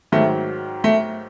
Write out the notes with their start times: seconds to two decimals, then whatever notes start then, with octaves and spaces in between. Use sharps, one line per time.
0.12 G#2 D#3 F#3 A3
0.84 A3